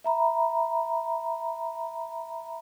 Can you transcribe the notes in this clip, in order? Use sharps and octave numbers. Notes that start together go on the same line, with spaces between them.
E5 A#5 B5